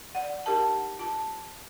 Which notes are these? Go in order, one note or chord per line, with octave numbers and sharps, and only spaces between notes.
D5 F#5
D#4 G4 A#4 F#5 A5
F4 A5